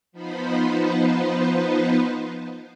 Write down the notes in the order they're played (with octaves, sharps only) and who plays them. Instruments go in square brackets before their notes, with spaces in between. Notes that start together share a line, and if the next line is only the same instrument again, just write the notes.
[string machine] F3 B3 D#4 B4 C5